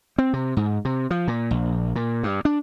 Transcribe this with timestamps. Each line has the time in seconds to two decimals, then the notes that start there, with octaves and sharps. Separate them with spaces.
0.18 C4
0.33 C3
0.57 G#2
0.85 C3
1.11 F3
1.28 A#2
1.51 A#1
1.96 A#2
2.23 G2
2.45 D4